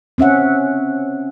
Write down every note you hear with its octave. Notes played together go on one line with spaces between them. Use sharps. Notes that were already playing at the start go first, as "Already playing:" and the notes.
C4 C#4 E5 F#5